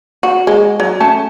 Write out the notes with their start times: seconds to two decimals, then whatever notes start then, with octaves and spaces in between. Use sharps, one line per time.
0.23 F#4
0.47 G#3
0.80 F#3
1.00 A3 C#4 A5